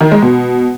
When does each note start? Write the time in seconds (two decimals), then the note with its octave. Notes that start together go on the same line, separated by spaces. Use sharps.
0.01 D#3
0.11 G#3
0.22 B2